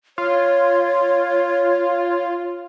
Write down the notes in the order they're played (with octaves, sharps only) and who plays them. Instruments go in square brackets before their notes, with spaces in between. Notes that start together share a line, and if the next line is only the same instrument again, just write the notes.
[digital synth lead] F4 [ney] C#5